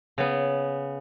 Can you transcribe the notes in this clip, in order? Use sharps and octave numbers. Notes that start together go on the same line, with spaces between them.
C#3 B3